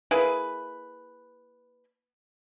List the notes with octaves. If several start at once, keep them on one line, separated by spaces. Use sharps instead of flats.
A#3 E4 G#4 B4